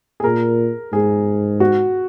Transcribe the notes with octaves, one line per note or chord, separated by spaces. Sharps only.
G#4
A#2 A#4
G#2 G#4
F#4